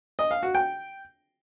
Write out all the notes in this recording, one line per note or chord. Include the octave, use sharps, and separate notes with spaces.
D#5
F5
F#4
G5